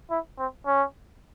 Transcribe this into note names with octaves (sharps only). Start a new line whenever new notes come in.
E4
C4
C#4